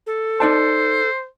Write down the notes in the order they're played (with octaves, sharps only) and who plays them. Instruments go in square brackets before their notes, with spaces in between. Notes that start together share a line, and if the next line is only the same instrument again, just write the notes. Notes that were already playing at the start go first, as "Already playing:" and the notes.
[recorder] A4
[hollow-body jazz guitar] D#4 D5 A5 [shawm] C5